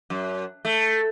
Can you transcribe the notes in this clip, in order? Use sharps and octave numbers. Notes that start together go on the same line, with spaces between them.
F#2
A3